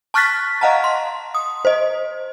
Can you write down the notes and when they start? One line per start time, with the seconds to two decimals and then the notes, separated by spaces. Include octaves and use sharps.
0.14 A5 C#6 F6 F#6 A6 B6
0.61 D#5 F5 F#5 A5 A#5
0.84 C6
1.34 D#6
1.65 C5 D#5